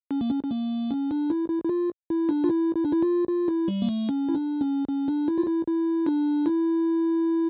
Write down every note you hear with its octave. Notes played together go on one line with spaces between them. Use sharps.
C#4
A#3
C#4
C#4
A#3
C#4
D4
E4
E4
E4
F4
E4
D4
F4
E4
E4
D4
E4
F4
F4
E4
G3
A#3
A3
C#4
E4
D4
C#4
C#4
D4
E4
F4
E4
E4
D4
E4